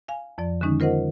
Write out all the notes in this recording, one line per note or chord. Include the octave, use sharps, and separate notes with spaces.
F5 G#5
F2 F3 D5
D3 D#3 G#3 C#4 D#4
F4 A#4 C5 D#5 F#5